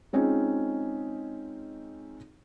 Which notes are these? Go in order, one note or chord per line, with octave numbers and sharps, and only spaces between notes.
G#3 C4 C#4 D#4 F4 G#4